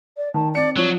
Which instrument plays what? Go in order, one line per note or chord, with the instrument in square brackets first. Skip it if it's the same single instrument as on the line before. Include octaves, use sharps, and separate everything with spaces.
[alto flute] D5
[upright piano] D#3 [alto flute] A5
[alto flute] C4 [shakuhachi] D5 [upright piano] C#7
[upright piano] F3 [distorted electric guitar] F#3 [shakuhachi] C#5